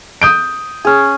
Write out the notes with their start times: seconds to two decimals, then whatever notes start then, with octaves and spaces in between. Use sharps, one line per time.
0.22 D#6 G6 D7
0.85 C#4 G#4